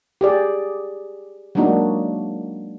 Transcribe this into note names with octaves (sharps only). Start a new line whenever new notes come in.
G4 G#4 D5
F#3 G#3 A#3 D4 D#4 F#4